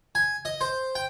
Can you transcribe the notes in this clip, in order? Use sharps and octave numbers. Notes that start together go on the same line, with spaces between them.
G#5
D#5
C5
G5